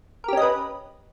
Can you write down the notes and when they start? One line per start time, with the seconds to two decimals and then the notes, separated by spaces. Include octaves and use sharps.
0.24 A#4
0.28 G4
0.33 C#4
0.37 D#5
0.42 B4